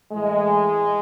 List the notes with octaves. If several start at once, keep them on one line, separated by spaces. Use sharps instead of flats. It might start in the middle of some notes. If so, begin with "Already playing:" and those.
A2 E3 G#3